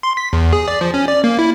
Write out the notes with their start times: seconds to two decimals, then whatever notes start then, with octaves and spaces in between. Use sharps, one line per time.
0.03 C6
0.17 B6
0.33 E2
0.53 G#4
0.68 D5
0.81 F3
0.94 C#4
1.08 D5
1.24 A#3
1.39 E4